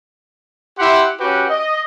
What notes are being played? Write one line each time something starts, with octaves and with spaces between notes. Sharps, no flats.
E4 G4 F#5 C6
C#4 F#4 G4 B4
D#5